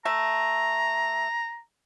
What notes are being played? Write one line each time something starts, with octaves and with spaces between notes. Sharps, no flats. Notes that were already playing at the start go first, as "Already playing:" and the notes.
A3 E5 A#5